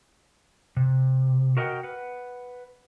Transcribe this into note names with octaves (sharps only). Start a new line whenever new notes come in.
C3
F#4 A#4 D#5 E5 F#5 G5
B4 F#5